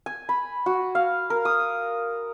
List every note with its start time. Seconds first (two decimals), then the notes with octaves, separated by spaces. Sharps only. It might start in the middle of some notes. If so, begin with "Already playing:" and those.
0.06 G#5
0.29 B5
0.66 F#4
0.95 F5
1.30 A#4
1.45 D#6